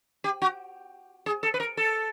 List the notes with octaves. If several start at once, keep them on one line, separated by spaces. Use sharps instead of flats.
G4
F#4
G#4
A4
B4
A#4
A4